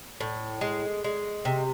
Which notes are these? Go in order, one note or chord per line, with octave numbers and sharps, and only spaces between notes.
A2
G#3
G#3
C3